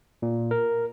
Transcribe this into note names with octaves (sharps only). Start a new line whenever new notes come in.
A#2
A#4